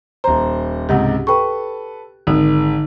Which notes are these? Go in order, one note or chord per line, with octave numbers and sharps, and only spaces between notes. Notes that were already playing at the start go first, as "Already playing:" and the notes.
D#1 C5 A#5
C#2 G#2 C3 G4 F#5
A4 B4 G5 B5 C#6
G#1 D3 D#4